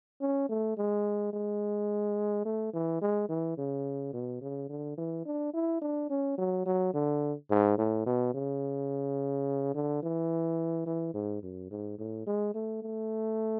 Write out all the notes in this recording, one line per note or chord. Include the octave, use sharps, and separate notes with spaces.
C#4
A3
G#3
G#3
A3
E3
G#3
E3
C#3
B2
C#3
D3
E3
D4
E4
D4
C#4
F#3
F#3
D3
G#2
A2
B2
C#3
D3
E3
E3
G#2
F#2
G#2
A2
G#3
A3
A3